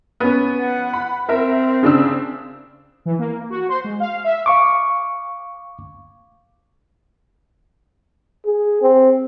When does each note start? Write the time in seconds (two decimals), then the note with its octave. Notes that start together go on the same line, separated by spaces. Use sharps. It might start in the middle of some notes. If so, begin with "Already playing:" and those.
0.20 B3 C#4
0.60 F#5
0.93 B5
1.29 C4 A#4 E5
1.83 C#3 D4 E6
3.06 E3
3.19 A#3
3.50 F#4
3.69 C5
3.84 G#3
4.00 F5
4.24 E5
4.46 F5 C#6 D6
8.45 G#4
8.82 C4